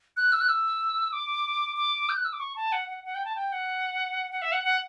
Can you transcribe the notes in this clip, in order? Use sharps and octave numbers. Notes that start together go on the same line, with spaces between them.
F#6
E6
F#6
E6
D6
D6
G6
F#6
E6
D6
C#6
A5
F#5
F#5
F#5
G5
A5
G5
F#5
F#5
E5
F#5
F#5